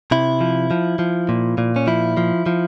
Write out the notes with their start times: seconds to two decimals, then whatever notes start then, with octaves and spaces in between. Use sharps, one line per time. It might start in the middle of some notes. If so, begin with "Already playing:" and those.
0.11 C3 E4
0.41 F3
0.71 F3
0.99 F3
1.29 A#2
1.58 A#2
1.76 C#4
1.87 F3 E4
2.17 F3
2.46 F3